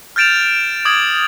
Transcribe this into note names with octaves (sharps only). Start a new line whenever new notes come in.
F6 G6 A6 D7 E7 F7
D6 D#6 G#6 F#7